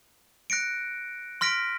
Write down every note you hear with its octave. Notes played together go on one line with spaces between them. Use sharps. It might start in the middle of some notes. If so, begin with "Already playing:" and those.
F#6 A#6 C#7 D7
C6 F6 A#6 B6 D7